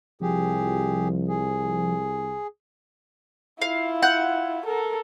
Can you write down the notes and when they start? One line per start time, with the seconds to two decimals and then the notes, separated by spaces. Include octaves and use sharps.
0.21 C2 F3 G4 G#4
1.28 G#4
3.62 E4 F4 F5
4.02 F#5 F#6 G6
4.66 A4 A#4